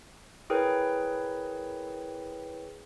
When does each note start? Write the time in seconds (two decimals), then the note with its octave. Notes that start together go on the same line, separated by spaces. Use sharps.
0.50 E4 G#4 A#4 B4 C#5 G5